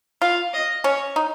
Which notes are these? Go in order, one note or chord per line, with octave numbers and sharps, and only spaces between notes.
F4 F5
D#5
C#4 C#5
D#4